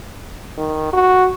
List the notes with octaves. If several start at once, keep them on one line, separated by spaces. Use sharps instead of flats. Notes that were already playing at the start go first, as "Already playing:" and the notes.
D#3
F#4